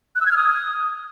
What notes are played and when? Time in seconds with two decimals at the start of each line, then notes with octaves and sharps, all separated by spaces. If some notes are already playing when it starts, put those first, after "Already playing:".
0.15 F#6
0.21 E6
0.26 G#6
0.31 F6
0.37 D#6